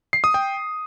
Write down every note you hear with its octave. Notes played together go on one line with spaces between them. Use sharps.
C7
D#6
G5